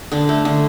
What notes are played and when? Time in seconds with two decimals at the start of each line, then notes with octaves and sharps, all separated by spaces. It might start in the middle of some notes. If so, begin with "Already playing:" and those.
0.12 D3 D4
0.29 A3
0.45 D3